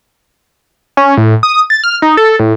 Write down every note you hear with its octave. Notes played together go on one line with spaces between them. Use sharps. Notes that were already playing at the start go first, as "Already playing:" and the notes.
C#4
A2
D#6
A6
F6
D#4
A4
A2